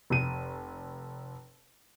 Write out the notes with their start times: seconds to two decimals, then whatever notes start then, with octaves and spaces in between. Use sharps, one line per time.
0.10 F1 D#7